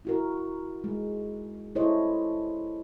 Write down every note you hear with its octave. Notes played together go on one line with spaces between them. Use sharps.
E4 F#4 A#4
G#3
E4 G4 A4 C5 C#5 D#5